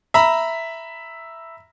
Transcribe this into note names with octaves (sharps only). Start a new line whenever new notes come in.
E5 A#5 B5